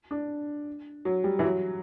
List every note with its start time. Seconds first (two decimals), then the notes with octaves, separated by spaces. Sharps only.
0.11 D4
1.05 F#3
1.24 G3
1.39 E3
1.43 F#3